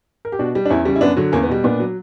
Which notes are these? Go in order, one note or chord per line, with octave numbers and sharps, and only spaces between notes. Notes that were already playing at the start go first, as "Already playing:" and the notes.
A#4
G4
B2 D4 F#4
G3
D4
E2 C#4 E4
C#3 G3
E4
F#2 B3 D4
D3 F#3
E2 A#3 C#4
B3
B2 G3
A#2 B3 D4
F#3